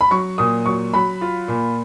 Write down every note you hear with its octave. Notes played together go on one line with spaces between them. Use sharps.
B5
F#3 C#6
A#2 D#6
F#3 C#6
F#3 B5
F4
A#2